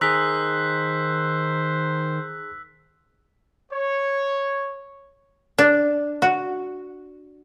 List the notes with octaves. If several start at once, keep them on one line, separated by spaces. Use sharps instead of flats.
D#3 G#4 C5 A#5 E6 F#6 B6
C#5
D4
F#4